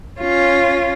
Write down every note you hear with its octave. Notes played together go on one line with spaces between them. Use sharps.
C#4 F4